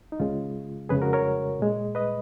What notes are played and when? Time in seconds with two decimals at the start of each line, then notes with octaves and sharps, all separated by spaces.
0.12 D#4
0.20 C#2 C#3 G#3 F4
0.89 F2 C#3 G#3 G#4 B4
1.02 F#4 A#4
1.13 A#4 C#5
1.60 A#2 G#3
1.95 B4 D#5